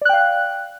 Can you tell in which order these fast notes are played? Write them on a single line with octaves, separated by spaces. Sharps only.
D5 F#6 G5 F5